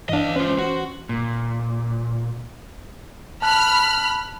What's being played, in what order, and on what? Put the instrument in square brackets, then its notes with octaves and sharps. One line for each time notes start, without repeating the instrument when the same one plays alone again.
[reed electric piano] G2 D4 [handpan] E3 [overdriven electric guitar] D#5 F5
[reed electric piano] C#4 [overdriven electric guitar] F4 B4 [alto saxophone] C5
[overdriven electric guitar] F#4
[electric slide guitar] A#2
[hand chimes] A5 F#6 [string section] B5 F6